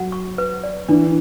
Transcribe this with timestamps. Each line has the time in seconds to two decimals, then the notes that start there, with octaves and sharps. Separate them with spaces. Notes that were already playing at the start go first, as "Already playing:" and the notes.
Already playing: F#3 F#5
0.12 C#6
0.38 B4
0.64 D5
0.88 E3 D4